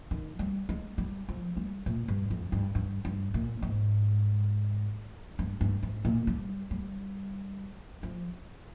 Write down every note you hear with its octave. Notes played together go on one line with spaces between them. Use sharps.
D#3
G3
G#3
G3
F3
G3
A#2
G2
F2
G2
G2
G2
A#2
G#2
G2
G2
G#2
A#2
G3
G3
F3